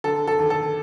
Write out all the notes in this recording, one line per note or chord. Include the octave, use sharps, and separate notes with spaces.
D3 A4
A4
D#2
A4